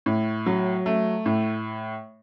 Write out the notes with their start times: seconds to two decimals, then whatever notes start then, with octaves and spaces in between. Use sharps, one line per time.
0.06 A2
0.46 F#3
0.86 A3
1.26 A2